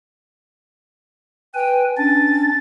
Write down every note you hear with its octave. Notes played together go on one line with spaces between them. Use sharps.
B4 G5 G#5
C#4 D4 A6